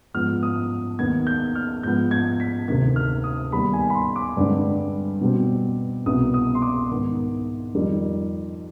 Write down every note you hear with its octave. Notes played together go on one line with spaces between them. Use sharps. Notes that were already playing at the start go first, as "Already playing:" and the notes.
G#2 F3 B3 F6
D#6
D#2 D#3 B3 G#6
G6
F6
G#2 F3 B3 G6
G#6
B6
D2 C3 D#3 G#6
F6
D#6
D#2 D#3 G3 B3 B5
G#5
B5
C6
D6
G2 D3 G#3 C4
B2 G3 C4
C2 B2 B3 D#6
D#6
C6
D6
G#2 D#3 B3
F2 D#3 G3